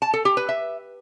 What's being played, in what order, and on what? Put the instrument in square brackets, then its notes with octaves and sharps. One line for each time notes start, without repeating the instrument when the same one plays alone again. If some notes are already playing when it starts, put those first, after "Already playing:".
[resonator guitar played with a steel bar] A5
A4
G4
B4
E5